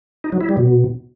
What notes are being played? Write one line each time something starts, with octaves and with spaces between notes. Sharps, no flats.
D#4
F#3
E4
G3
B2